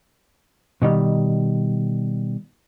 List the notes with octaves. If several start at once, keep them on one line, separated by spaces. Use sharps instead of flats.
B2 D#3 G3